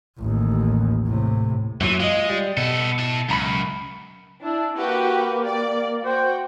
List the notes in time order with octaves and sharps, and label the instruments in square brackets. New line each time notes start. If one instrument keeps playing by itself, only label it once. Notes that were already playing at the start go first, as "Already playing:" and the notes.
[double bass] A1 D#2
A2 C3
[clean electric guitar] F#2 A#2 F#3 [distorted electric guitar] E3
[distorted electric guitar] G#3 [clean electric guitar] F4 D#5
[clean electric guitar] G3
[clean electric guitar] B2 [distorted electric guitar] B3 A4
[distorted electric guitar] E4 A5
[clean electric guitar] C#2 A#5 B5 [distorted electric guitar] F#2
[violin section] D4 [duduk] E4
[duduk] A#3 [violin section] F#4 G4 B4
[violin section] D5
[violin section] F#4 G5 [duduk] C5